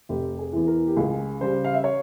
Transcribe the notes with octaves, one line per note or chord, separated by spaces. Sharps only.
F1 G4
G#4
E2 E3
A#4
G4
C#2 G#4
C#3 G3 C5
F5
E5
C#5